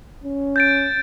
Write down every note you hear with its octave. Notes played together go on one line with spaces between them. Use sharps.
C#4
G6 A6 D7